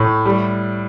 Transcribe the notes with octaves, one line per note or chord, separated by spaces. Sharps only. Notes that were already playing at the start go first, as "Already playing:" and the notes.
Already playing: A2 A3
G3